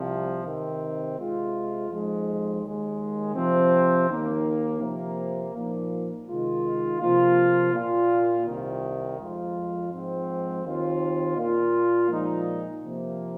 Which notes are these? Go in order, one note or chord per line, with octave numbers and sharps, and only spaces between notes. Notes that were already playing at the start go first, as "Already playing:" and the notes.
Already playing: C2 C3 F3
C3 D#3 C4
C3 G#3 F4
F2 F3 G#3 D#4
D#2 D#3 G#3
C3 F3 C4
D#2 D#3 A#3 D#4
C3 F3 A#3
A#2 F3 A#3 D#4
C3 D#3 G#3 F4
C3 F3 A#3 F4
A#2 A#3 F4
C2 C3 D#3
F2 F3 G#3 F4
G#2 F3 G#3 C4
D#2 D#3 C4 F4
A#2 A#3 F4
A#2 F3 G#3 D#4
C3 F3 A#3